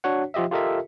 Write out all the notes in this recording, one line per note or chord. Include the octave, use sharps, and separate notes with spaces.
D4 F#4 C#5 F#5
F3 F4 G4 D#5 E5
F4 G4 A4 A#4 D#5 E5